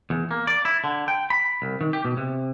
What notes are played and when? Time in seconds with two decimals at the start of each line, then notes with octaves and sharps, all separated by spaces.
0.10 E2
0.31 A#3
0.47 D5
0.65 E4
0.84 D3
1.08 G5
1.30 B5
1.62 C2
1.81 D#3
1.93 G4
2.05 B2
2.17 C3